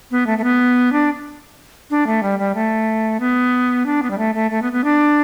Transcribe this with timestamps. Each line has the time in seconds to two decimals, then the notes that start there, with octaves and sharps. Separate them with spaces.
0.11 B3
0.27 A3
0.38 A3
0.44 B3
0.92 D4
1.90 D4
2.07 A3
2.23 G3
2.39 G3
2.55 A3
3.20 B3
3.86 D4
4.03 B3
4.11 G3
4.18 A3
4.35 A3
4.51 A3
4.62 B3
4.72 B3
4.84 D4